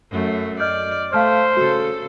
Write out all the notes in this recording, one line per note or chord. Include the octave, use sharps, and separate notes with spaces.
F#2 A3
D5 D#5 F6 G6
A3 C5 F5 A5 F6
C#3 F#4 A4